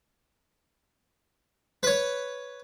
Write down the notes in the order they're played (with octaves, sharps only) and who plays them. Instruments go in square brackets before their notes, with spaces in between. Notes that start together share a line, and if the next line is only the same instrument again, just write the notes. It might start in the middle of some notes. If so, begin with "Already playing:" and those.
[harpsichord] B4 C#5